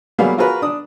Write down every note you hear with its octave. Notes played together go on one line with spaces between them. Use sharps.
F#3 G3 A#3 B3 G#4 F5
F4 F#4 G#4 A#4 B4
D4 D#6